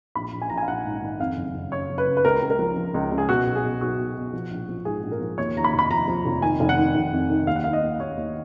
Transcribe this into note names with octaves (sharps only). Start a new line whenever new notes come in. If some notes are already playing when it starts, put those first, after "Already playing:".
A#1 B5
A#1
G#5
A#1 A#5
G#5
F5
A#1 F#5
G#2
D#3
F2 F5
F#1
F#1
C#3 C#5
F#1
B4
C#3
B4
C#2 A#4
C#2
A#4
F3
F3
C#2
C#2
G#4
B2 F#4
B1
G#4
B2
B1 F#4
B2
B2
F3
A#1
F3
G#2 G#4
A#1
A#4
F3
D#2 C#5
D#2 A#5
B5
F1
B5
F3 A#5
F3
F1
D#3 G#5
F1
F#5
D#3
F1
F2
D#3
D#2 F5
F#5
D#3 F5
D#5
D#2
D#2 C#5
D#2